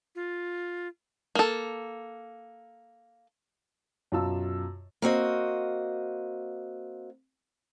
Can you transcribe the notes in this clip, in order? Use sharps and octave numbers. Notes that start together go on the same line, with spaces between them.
F4
A#3 A4
F#2 B2 F4 A5 E6
A#3 C4 F#4 D#5